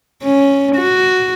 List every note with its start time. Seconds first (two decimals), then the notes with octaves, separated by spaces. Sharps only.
0.23 C#4
0.76 F#4